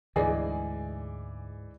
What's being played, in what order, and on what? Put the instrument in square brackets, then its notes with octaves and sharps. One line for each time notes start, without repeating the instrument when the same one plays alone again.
[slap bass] D2 [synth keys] G#2 [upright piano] E3 D5 [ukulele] G#4 D#5 G#5